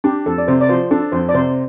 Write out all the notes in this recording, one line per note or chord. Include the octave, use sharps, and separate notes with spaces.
D4 G4
F2 A4
D5
C3 C5
D5
F3 C5
D4 A4
F2 C5
D5
C3 C5